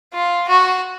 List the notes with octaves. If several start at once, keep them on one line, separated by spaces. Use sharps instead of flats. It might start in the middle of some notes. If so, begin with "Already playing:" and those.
F4
F#4